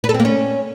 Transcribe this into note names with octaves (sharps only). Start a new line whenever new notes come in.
B4
A4
C4
A#3
C#4